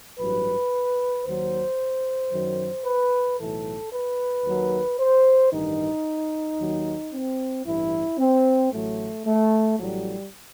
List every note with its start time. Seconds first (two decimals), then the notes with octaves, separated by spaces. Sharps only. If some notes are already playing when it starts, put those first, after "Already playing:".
0.18 A1 G2 F#3 B4
1.24 D#2 D#3 F#3 C5
2.31 F#2 D#3 F#3
2.84 B4
3.38 B1 A2 E3 A4
3.91 B4
4.44 D#2 D#3 F#3
4.98 C5
5.51 A1 G2 D#3 D#4
6.58 D#2 D#3 F#3
7.12 C4
7.65 A1 G2 E3 E4
8.18 C4
8.71 A1 A2 F#3 A3
9.25 A3
9.78 A1 A2 F#3 G3